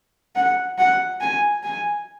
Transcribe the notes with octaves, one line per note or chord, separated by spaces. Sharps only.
F#5
F#5
G#5
G#5